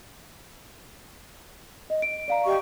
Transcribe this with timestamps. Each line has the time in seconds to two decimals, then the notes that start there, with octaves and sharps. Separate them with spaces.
1.90 D#5
2.02 D7
2.28 D5 F5 A#5
2.45 G4 D#5 C#6